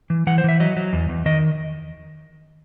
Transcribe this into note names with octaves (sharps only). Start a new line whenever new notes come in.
E3
E3 F#5
C5
E3 E5
F#3 D#5
F#3
E2
E2
D#3 D#5